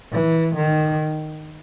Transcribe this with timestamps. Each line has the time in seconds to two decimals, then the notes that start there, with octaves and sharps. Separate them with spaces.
0.12 E3
0.55 D#3